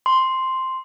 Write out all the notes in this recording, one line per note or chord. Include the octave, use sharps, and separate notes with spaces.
C6